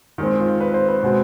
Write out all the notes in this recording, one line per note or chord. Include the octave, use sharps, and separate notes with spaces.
D#3 G#3 C4
F4
B4
C5
B4
B2 G#3 C4